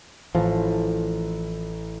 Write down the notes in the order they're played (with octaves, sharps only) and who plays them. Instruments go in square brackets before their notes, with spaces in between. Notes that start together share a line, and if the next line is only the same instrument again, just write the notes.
[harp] A1 [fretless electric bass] F3